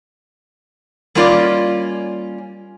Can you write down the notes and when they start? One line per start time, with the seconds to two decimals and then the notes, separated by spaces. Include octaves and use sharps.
1.15 G3 A#3 C#4 F4 D5 D#5